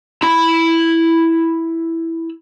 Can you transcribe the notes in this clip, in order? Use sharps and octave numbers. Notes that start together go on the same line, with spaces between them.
E4 B5